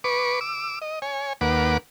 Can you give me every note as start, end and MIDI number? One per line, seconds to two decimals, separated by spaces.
0.04 0.40 71
0.04 0.40 85
0.04 0.40 86
0.41 0.79 86
0.41 0.79 88
0.82 0.99 75
1.02 1.33 73
1.02 1.33 80
1.41 1.77 39
1.41 1.77 58
1.41 1.77 71
1.41 1.77 78
1.41 1.77 86